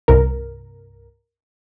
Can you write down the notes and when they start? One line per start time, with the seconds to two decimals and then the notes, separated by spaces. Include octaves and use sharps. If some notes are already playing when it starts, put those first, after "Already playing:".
0.08 C2 G2 A#4